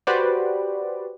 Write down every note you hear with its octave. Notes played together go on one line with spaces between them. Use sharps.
F#4 G4 B4 C5 D5